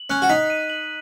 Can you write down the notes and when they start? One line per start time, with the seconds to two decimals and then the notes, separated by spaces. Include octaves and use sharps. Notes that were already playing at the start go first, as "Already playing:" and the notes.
Already playing: F#7
0.10 C#4 F#6
0.22 F#4
0.30 D#4 B6
0.50 D#7
0.70 F#7